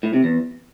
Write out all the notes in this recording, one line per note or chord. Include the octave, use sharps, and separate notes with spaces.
A2
C3
E2